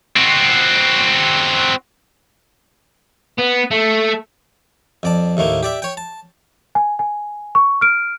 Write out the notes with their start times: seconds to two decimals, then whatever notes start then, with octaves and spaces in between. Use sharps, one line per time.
0.16 C4 F#4
3.38 B3
3.71 A3
5.03 F2 D5 A5
5.37 D#2 A2 A3 A#3
5.63 G4 D5 E5
5.82 C#5 G5
5.97 A5
6.75 G#5
6.99 G#5
7.55 C#6
7.81 F6 D7